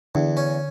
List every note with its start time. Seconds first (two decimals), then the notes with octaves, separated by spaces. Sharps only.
0.15 E2 D3
0.37 C#4